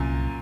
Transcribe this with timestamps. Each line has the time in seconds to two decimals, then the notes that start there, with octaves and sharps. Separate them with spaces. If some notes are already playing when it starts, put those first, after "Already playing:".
Already playing: C2 F#2 A#2